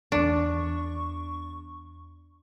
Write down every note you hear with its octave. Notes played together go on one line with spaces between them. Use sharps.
E2 D4 C#6